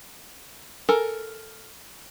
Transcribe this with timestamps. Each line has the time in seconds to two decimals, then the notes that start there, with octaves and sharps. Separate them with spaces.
0.89 A4 A#4 G#5